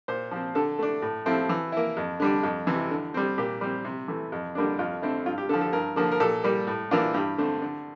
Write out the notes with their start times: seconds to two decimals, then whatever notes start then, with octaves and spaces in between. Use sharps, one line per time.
0.08 A#2 C5
0.31 F3 C4
0.55 D3 A4
0.79 A3 D4
1.02 A2
1.26 F3 A3 C4 E4
1.49 E3
1.72 A#3 E4
1.97 F2
2.20 D3 G3 D4
2.43 F2
2.67 C3 E3
2.91 D3
3.14 G3 C4
3.38 A#2 G4
3.61 G3 C4
3.85 C3
4.08 E3 A3
4.32 F2
4.55 D3 G3 A#3 D4
4.79 F2 F4
5.02 D3 A3 C4 E4
5.26 G2 F4
5.38 G4
5.49 D3 A4
5.53 F3
5.61 A4
5.73 G2 A#4
5.96 D3 F3 A#3
6.12 A#4
6.20 A#2 A4
6.44 G3 A#3
6.67 A2
6.91 E3 A#3 D4 F4
7.14 G2 G4
7.38 D3 A3 C4
7.61 D3